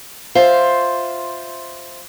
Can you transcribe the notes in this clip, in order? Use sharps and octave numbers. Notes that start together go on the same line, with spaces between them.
F4 C5 E5